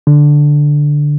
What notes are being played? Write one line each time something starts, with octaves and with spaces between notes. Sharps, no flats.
D3